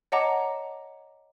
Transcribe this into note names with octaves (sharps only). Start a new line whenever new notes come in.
C#5 D#5 F#5 A5 A#5 D6